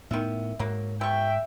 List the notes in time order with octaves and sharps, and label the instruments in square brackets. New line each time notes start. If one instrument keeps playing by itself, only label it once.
[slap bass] A2 B3 [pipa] D#3 E5
[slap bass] G#2 [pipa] F#3 A#3
[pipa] B2 C#6 [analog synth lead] E5 [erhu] G5